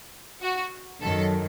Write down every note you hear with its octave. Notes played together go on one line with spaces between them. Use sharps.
F#4
F#2 D#3 F#3 A4